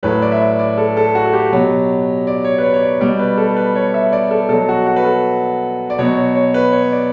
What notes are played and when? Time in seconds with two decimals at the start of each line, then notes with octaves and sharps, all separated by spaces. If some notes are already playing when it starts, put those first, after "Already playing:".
0.03 A2 F#3 B4
0.22 D5
0.32 E5
0.40 D5
0.59 D5
0.77 A4
0.97 A4
1.15 F#4
1.26 A4
1.33 G4
1.52 B2 F#3
2.27 D5
2.44 C#5
2.58 B4
2.63 C#5
2.74 C#5
2.83 D5
3.01 B2 G3 D5
3.19 B4
3.37 A4
3.56 B4
3.75 C#5
3.94 E5
4.12 D5
4.31 A4
4.49 B2 F#3 A4
4.69 F#4
4.87 F#4
4.96 B4
5.05 A4
5.90 D5
5.98 B2 F#3 C#5
6.16 C#5
6.35 C#5
6.54 B4
6.72 C#5
6.92 D5